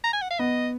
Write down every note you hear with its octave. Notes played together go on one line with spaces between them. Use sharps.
A#5
G#5
F#5
F5
B3 D#5